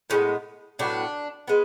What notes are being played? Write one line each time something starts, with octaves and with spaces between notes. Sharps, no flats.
A2 G#3 B3 C#4
A2 F#3 B3 D4
G#3 B3